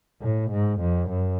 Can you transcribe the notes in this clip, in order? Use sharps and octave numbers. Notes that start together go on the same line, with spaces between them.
A2
G#2
F2
F#2